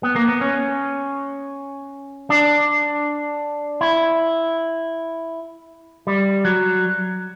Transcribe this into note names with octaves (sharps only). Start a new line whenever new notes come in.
B3
A#3
B3
C#4
D4
E4
G3
F#3